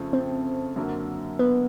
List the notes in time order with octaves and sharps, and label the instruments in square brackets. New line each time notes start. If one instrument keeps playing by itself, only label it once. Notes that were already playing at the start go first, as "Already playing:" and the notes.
Already playing: [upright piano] F2 C#3 F3 A3
[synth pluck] C4
[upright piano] F#2 D3 F#3 A#3
[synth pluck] B3